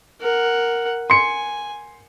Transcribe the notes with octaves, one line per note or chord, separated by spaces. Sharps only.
A#4 F#5
G#5 C6 C#7